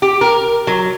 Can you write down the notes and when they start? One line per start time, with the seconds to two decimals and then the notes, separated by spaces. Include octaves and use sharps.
0.02 G4
0.21 A#4
0.67 F#3